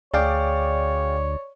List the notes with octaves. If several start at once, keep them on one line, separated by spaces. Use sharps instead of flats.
D2 G#4 C#5 D5 F5 G5